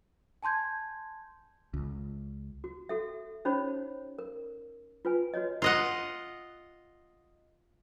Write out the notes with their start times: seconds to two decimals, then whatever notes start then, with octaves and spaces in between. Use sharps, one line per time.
0.43 G#5 A5 C6 G6 G#6
1.74 C#2
2.64 F#4
2.89 F#4 A4 E5
3.45 C#4 D#4 F#4 C5 C#5 B5
4.19 A#4
5.05 F4 B4 G#5
5.34 F#4 B4 C#5 D#5
5.62 F4 D#5 F#5